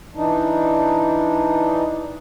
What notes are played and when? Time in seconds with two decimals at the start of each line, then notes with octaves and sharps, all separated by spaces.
0.15 E3 D4 D#4